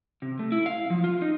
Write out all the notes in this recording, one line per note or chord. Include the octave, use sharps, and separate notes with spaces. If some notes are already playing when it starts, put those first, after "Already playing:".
C3
A3
E4
F5
F3
F4
D#4